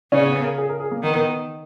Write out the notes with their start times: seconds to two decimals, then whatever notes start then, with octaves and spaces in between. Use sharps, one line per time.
0.12 C#3 C#4
0.27 B3
0.43 A#4
0.58 G#4
0.69 A#4
0.80 G#4
0.91 A#3
1.03 D#3 B3